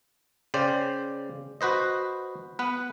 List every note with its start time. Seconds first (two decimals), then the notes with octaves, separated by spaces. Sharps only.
0.54 C#3 C5 D5 G5
1.61 F#4 B4 C5 D#5
2.59 B3 B4